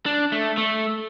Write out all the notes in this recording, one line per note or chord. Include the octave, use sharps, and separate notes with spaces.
D4
A3
A3